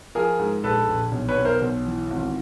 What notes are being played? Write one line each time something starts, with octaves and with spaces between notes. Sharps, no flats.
F3 G#4 A#4
G#2
A#1 A4 B4
A#1
B1
B4 C#5
B1
A#4 C5
B1
E3
G#1